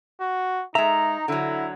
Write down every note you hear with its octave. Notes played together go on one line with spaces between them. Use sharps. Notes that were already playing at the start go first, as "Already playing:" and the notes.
F#4
G#3 D#4 E5 A#5
D3 F#3 E4